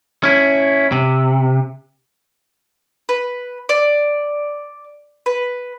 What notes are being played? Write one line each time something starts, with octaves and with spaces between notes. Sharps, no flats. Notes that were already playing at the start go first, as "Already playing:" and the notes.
C#4 E4
C3
B4
D5
B4